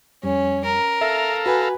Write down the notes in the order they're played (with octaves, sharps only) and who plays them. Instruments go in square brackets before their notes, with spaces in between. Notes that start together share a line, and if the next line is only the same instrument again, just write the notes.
[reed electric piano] F2 G3 [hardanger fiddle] C#4
[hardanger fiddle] A#4
[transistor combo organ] A4 F5 A#5 [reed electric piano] E5
[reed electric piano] F#4 G#5 [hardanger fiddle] B4